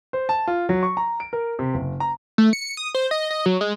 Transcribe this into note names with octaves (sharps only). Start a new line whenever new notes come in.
C5
A5
F4
F#3
C#6
A#5
D7
A#4
C3
F#1
A#5
A3
C#7
D#6
C5
D#5
D#5
F#3
G#3